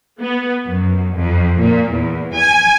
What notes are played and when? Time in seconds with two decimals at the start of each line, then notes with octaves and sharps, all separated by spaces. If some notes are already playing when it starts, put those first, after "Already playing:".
0.20 B3
0.67 F#2
1.16 F2
1.60 A#2
1.92 E2
2.34 G#5